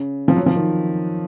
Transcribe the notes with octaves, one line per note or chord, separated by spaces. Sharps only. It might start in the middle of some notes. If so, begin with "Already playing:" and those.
Already playing: C#3
F3
F#3
F3
D#3